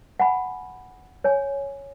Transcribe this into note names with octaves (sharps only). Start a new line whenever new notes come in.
F#5 G#5 B5
C#5 G#5